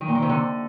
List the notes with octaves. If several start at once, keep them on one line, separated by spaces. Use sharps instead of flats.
D#3
A#2
D#3
C3
D3